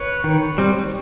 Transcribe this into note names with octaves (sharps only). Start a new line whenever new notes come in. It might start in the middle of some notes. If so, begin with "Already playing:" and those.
Already playing: B4 C#5
D#3
G3 C4